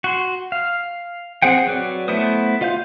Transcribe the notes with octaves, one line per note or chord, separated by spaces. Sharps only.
F#4 C6
F5
C4 G#4 C5 F#5 G5
F#3 B4 D5
A3 B3 E4 C5 D#6
F4 D#5 F5 C6 G6